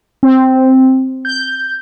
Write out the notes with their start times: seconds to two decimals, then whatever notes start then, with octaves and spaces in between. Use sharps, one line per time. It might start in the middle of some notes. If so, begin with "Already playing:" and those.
0.23 C4
1.25 G6